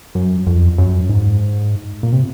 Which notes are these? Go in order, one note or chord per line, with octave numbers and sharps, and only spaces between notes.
F#2
F2
F#2
G#2
A#2
C3